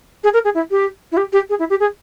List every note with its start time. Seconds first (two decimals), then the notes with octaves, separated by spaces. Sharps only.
0.23 G#4
0.33 A#4
0.44 G#4
0.54 E4
0.70 G4
1.11 E4
1.17 G4
1.32 G4
1.49 G#4
1.59 E4
1.69 G4
1.80 G#4